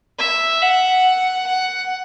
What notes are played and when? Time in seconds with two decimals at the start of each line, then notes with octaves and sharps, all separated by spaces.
0.19 E5
0.62 F#5
1.47 F#5